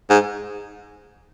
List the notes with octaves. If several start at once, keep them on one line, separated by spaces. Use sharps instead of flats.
G#2